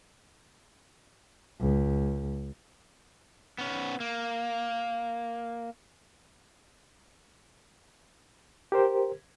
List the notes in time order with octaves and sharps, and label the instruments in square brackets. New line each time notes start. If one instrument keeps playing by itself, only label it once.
[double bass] C#2
[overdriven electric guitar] B3 C#4
A#3
[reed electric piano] G4 A#4 C5